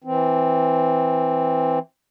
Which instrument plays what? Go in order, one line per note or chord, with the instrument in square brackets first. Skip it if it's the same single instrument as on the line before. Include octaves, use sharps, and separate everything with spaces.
[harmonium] E3 C4